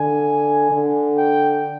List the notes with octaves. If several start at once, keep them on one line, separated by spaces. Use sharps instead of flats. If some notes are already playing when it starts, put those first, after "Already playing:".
Already playing: D3 G#5
D3
G5